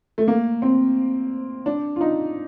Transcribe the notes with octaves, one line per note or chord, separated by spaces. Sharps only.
A3
A#3
C4
D4
F4
D#4